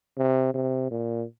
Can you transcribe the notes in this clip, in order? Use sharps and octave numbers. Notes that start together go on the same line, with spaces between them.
C3
C3
A#2